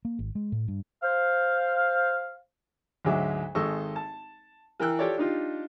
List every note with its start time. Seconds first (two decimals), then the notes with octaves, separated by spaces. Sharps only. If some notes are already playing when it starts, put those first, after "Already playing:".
0.05 A#3
0.19 G#1
0.35 G#3
0.52 A2
0.68 G2
1.01 C5 F5
3.05 D2 G#2 F#3 G#3 E5 D6
3.55 G#1 G#3 A4 D#5 C#6 E6
3.96 A5
4.80 E3 A#4 G5 E6 F#6
4.99 F4 G4 A4 C#5 D5
5.18 D4 D#4 F4 G4